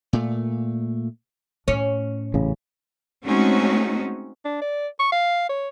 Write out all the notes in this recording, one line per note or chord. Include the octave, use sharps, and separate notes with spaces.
A#2 A3
A2 C#4
A1 C#3
G#3 A3 C4 C#4 D#4 F#4
D4
D5
C#6
F5
C#5